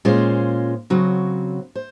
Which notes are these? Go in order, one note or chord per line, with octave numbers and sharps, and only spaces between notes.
A#2 G#3 C#4 F4 C5
C#3 F#3 C4 F#4
C5